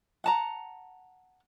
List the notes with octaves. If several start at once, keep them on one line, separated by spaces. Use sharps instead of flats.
F#5 A5 A#5